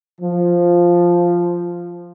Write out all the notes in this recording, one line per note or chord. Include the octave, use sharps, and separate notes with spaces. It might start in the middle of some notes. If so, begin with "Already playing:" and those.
F3